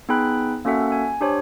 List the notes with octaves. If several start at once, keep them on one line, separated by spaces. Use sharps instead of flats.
B3 D#4 G#4 G5 B5 F#6
A#3 C#4 F#4 A4 E5 F#5
G#5
D4 G4 C5 C#5